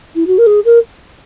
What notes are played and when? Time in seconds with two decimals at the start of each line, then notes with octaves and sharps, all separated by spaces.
0.16 E4
0.27 F#4
0.38 A#4
0.46 G#4
0.65 A#4